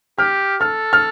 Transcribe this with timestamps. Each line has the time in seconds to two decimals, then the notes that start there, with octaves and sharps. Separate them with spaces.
0.19 G4 F6
0.61 A4 F6
0.93 F6